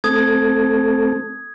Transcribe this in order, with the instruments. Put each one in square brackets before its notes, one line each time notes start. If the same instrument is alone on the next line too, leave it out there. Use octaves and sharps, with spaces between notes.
[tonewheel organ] A3 C4 A4 [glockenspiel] D#6 G#6